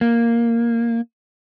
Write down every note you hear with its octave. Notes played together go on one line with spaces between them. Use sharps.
A#3